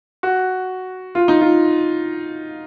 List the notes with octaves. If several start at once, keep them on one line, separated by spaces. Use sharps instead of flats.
F#4
F4
D#4
F4